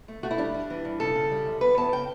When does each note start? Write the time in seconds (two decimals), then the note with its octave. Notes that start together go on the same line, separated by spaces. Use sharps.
0.08 A3
0.23 A3 F#4
0.31 E4
0.38 G3 D4
0.54 G3
0.70 E3
0.85 G2
1.00 C#3 A4
1.15 C#3
1.31 G3
1.46 F#2
1.61 E2 B4
1.77 E2 A5
1.92 C#3 G5